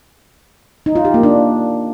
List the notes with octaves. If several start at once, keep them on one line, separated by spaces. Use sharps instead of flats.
D#4
F4
G4
A#3
D4